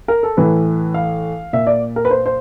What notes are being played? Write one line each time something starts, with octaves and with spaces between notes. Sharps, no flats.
A#4
A4
A2 E3 B4
F5
A#2 E5
D5
A#4
B4
C5
C5